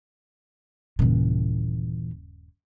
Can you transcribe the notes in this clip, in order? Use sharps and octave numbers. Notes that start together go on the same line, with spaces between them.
D#1 G2 A#2 C#3 E3